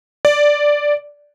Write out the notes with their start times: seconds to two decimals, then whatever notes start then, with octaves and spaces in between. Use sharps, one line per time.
0.25 D5